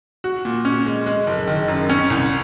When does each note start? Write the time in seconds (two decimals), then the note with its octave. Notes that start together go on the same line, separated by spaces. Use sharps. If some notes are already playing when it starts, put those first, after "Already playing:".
0.24 F#4
0.45 A#2
0.65 C#4
0.86 G#3
1.06 G#3
1.27 F#1
1.47 D#3
1.68 F#2
1.89 C#4
2.10 C2